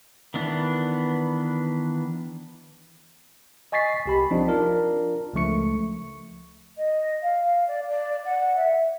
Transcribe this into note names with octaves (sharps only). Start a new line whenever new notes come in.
D#3 E3 B3 D4
D#5 G#5 C#6 A6 B6 C7
C2 G4 B5
F3 C4 D4 D#4
D4 F4 A#4
C#2 F3 A3 C#6 C#7
D#5
F5
D5
D5
F#5
E5